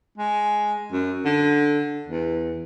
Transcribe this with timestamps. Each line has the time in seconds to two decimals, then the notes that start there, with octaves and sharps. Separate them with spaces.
0.18 G#3
0.92 F#2
1.25 D3
2.07 E2